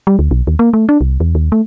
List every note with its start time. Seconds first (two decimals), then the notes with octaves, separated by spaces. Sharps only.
0.07 G3
0.19 D2
0.31 B1
0.47 D#2
0.59 A#3
0.73 A3
0.89 D4
1.01 C2
1.20 E2
1.35 D#2
1.52 A3